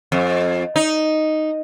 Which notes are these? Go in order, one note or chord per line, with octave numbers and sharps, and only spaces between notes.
F2
D#4